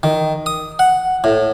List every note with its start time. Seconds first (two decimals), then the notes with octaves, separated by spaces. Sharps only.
0.03 D#3
0.46 D#6
0.79 F#5
1.24 A2